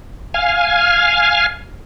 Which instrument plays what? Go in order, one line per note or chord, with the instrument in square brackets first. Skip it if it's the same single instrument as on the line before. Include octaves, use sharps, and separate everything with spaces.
[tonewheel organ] F5 G#5